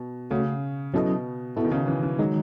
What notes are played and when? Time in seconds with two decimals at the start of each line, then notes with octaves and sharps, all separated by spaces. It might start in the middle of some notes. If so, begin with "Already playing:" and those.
Already playing: B2
0.30 C#3 A3 C#4 F#4
0.94 B2 F#3 C#4 E4 A4 D#5
1.56 B2 B3 E4 A4
1.64 D#3
1.72 C#3
1.88 E3
2.03 E3
2.19 D#3 F#3 G#3 D#4